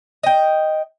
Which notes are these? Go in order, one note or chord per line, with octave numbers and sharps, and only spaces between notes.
D#5 G5